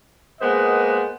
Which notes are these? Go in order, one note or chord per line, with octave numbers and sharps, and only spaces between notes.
G#3 A#3 B3 C5 D#5 F#5